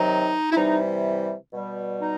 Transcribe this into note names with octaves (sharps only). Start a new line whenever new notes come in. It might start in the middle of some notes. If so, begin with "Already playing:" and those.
Already playing: C3 D#3 F#3 D#4
E4
C3 E3 G3 D#4
B2 G3
D#4